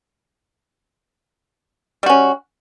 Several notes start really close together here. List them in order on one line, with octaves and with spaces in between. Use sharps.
G3 F#4 C#4